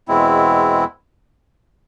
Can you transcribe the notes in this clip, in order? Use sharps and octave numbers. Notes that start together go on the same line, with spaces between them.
E2 B2 G#3 C4 E4